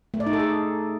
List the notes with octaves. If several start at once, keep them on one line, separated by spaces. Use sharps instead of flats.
A3
D5
D#4
A4
G#4